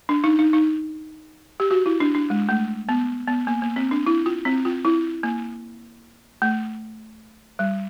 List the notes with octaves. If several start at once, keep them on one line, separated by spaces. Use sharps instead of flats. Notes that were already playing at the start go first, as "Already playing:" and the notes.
D4
D#4
D#4
D#4
G4
F#4
E4
D4
D4
G#3
A3
B3
B3
A#3
A#3
C4
D4
E4
F4
C4
F4
E4
A#3
A3
G3